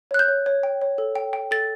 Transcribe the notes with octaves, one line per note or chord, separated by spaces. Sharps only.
C#5 F#6
G6
C#5
C#5
G5
C#5
A4
G5
G5
A4 A6